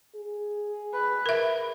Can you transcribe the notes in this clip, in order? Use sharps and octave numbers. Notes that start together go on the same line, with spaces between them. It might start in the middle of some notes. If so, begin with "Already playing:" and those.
G#4
B4
A#4 E5